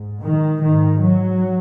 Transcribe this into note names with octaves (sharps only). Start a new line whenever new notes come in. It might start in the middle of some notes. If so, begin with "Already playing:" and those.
Already playing: G#2
D#3
G#2 D#3
F#3